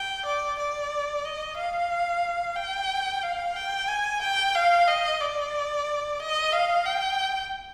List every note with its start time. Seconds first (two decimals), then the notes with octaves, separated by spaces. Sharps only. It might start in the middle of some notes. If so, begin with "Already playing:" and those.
Already playing: G5
0.26 D5
0.59 D5
1.25 D#5
1.57 F5
2.56 G5
3.23 F5
3.56 G5
3.88 G#5
4.22 G5
4.55 F5
4.88 D#5
5.21 D5
6.20 D#5
6.53 F5
6.86 G5